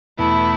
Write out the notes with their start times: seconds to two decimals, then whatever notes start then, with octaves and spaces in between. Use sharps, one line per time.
0.18 E2 B2 A3 E4